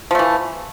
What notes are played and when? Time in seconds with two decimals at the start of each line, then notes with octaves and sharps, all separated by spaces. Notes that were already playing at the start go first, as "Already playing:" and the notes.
0.11 F3
0.15 A3
0.19 E3